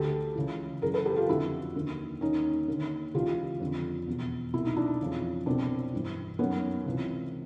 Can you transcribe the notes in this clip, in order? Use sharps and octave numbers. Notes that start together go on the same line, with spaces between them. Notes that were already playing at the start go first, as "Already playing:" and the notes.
Already playing: D2 D3 G4 A4
C#2 C#3 E3
F#2 C#3 E3 G#4 A#4
A4 B4
G4 A4
F4 G4
F2 D3 E4 F#4
D#2 D3
D#2 D#3 C#4 D#4
D#2 D3
C#2 C#3 E3 F4 G4
F2 D3
E2 B2
C2 B2 E4
D#4
D4 E4
F2 C#3 E3
C2 B2 C4 D4
G2 E3
F#2 D#3 B3 C#4
C#2 C3 E3